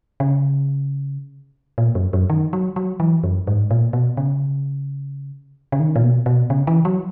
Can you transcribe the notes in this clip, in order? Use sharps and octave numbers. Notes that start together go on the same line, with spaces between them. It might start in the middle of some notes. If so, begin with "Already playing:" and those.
C#3
A#2
F#2
F#2
D#3
F#3
F#3
E3
F#2
G#2
A#2
B2
C#3
C#3
D#3
A#2
B2
B2
C#3
E3
F#3